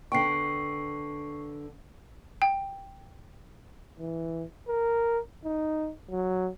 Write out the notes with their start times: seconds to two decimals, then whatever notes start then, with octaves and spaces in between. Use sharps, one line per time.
0.12 D3 B3 G5 C#6 C7
2.42 G5
4.00 E3
4.68 A#4
5.45 D#4
6.10 F#3